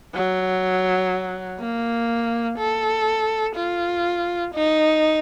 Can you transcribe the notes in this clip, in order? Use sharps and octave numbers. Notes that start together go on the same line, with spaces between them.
F#3
A#3
A4
F4
D#4